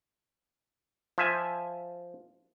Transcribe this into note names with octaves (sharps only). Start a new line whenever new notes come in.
F3 E5 G#5